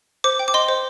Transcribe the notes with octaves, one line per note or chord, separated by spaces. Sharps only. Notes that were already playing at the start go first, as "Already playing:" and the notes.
C5 D6
G5
D6
D#5 C6
C5